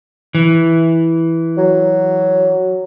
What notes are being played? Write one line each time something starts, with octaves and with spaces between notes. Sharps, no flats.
E3
F#3